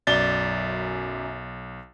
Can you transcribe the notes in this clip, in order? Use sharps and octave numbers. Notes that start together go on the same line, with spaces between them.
B1 F#2 D5 A6 G7